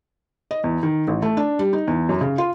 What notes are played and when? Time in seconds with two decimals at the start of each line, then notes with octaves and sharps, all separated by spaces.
0.51 D#5
0.64 E2
0.83 D#3
1.08 A1
1.22 A3
1.37 D4
1.59 G3
1.73 D#4
1.88 E2
2.09 F#2
2.21 C#3
2.38 F4